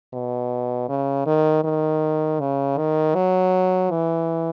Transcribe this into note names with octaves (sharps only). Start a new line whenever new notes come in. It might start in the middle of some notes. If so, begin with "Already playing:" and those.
B2
C#3
D#3
D#3
C#3
D#3
F#3
E3